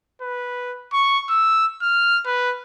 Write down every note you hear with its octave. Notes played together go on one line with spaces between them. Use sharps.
B4
C#6
E6
F6
B4